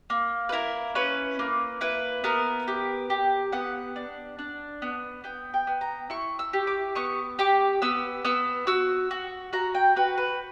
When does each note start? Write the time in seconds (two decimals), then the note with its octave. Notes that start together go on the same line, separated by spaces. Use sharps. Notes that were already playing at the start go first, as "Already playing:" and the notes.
0.10 A#3
0.49 B4
0.52 E4 A#4
0.95 C#4 B4
1.39 A#3
1.81 E4 B4
2.24 B3 A#4
2.68 G4
3.10 G4
3.52 B3 F#5
3.96 D4
4.39 D4
4.82 B3
5.24 B3 G5
5.54 G5
5.67 B3
5.81 A#5
6.10 E4 C#6
6.39 E6
6.53 G4
6.67 D6
6.95 B3 C#6
7.39 G4 D6
7.82 B3 E6
8.25 B3 E6
8.67 F#4 E6
9.11 F#4
9.53 F#4 A#5
9.75 G5
9.96 F#4 B4
10.18 B4